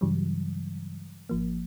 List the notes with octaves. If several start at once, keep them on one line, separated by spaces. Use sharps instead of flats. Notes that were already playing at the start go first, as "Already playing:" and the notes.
G2 C#3 E3 F#3 G3
G#1 F3 A#3